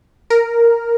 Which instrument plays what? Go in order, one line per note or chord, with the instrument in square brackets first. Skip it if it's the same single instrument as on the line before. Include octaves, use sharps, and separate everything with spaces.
[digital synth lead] A#4